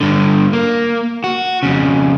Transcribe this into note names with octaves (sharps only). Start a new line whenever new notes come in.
G2 D3
A#3
F#4
F2 C#3